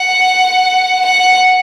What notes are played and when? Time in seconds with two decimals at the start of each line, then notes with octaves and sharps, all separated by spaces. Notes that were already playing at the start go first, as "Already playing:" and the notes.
Already playing: F#5
1.05 F#5